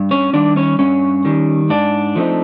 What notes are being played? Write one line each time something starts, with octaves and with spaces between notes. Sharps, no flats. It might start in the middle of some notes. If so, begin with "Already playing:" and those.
Already playing: G2
C#4 C#5
D#3 G3 D4 D5
C#4 C#5
G2 C#4 C#5
D#3 G3
G#2 D4 D5
F3 A3 C4 D#4